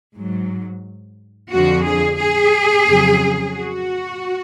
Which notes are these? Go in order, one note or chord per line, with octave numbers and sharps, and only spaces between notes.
G#2 F#3
F2 D3 F3 F#4
G#4
G#4
F2 C#3 F#3
F#4